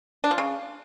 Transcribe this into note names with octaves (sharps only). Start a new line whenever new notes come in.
D4
F3
C#3